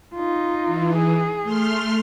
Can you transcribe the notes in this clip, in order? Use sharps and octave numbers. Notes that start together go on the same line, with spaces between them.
D#4 F4
E3
G#4
A3 C6 F6